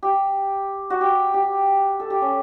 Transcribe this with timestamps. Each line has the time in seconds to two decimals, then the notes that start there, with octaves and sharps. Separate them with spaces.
0.03 G4
0.90 F#4
1.01 G4
1.34 G4
2.00 A4
2.10 G4
2.22 C#4